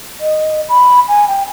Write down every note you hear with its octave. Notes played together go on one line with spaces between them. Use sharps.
D#5
B5
G#5
G5